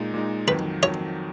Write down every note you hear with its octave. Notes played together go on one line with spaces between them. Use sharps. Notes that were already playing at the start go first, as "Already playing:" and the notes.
Already playing: A#2 G#3 D#4
A#2 G#3 D#4
F2 D#3 F#3 B4
F2 D#3 F#3 C#5